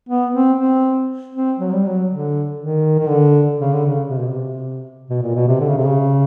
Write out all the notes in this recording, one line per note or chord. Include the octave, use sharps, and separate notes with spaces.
B3
C4
C4
C4
F#3
G3
F#3
D3
D#3
D#3
D3
C#3
D3
C#3
C3
B2
C3
B2
A#2
B2
C3
D3
C#3
C3
C#3